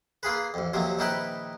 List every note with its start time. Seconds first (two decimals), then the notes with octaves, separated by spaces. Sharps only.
0.23 A#3 F4 G#4 B4
0.54 A1 F2
0.73 D#2 C3 F3 F#3
0.99 A#1 D#3 D#4 E4 B4 G5